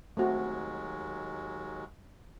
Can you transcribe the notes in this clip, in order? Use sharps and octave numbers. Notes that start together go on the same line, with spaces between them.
D#2 F#3 G#3 A3 C4 F#4